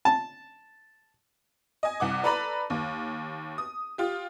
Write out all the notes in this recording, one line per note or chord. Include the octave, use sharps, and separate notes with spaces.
A5
D#5 G#5
C2 F#5 D6
A4 B4 D5 A#5 B5
D#2
D#6
F4 G4